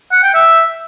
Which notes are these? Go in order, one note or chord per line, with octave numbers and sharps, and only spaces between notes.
F#5
G5
E5